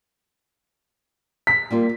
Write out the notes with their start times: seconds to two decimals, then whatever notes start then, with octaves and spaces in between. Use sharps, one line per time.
1.47 B6
1.70 G3 A#3 F4